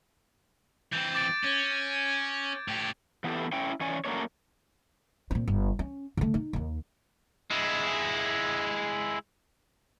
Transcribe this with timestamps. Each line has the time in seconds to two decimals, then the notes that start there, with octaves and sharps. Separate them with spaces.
0.93 E3 C4 G6
1.15 D6 A6 D7
1.44 C#4 G#6
2.68 A2 G4
3.24 E3 B3 E4 G4 A4
3.52 C#4 E4 C#5 G5
3.81 E3 C#4 C#5 D5 G#5
4.05 F#3 A3 A#3 C#4 D4 C#5
5.31 A#2 C4
5.48 G1
5.79 C#4
6.17 D3 A3
6.34 D#4
6.53 D#2 D#3
7.51 G#3 E4